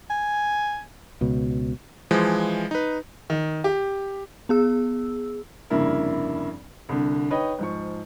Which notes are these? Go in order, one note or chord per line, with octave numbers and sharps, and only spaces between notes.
G#5
C#2 B2
E3 F3 G#3
D#4 B4
D#3
G4
B3 G#4 E6
F1 G2 C#3 A#3 E4 A#4
C2 D3
D#4 B4 C#5 D#5 G5
G#2 F3 C#6